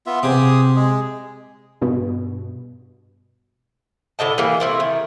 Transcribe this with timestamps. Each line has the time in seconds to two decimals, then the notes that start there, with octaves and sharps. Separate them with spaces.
0.06 B3 F4 E5
0.23 C3 G4 G#4 D#6
0.76 G#3 G#4
1.81 G2 B2
4.19 A2 D3 D#5 A5
4.38 E3 G3 A#3
4.60 A3 C4 E4
4.80 D#3